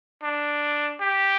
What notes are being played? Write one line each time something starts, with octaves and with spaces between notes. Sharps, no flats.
D4
G4